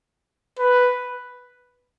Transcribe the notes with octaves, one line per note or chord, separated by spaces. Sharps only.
B4